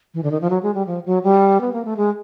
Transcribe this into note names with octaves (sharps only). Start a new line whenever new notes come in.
E3
D3
D#3
F3
F#3
G#3
G3
F3
F#3
G3
B3
A#3
A3
G#3